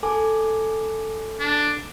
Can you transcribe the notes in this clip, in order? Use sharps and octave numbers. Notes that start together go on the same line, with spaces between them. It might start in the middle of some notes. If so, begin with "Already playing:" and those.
A4 G#5 D6
D4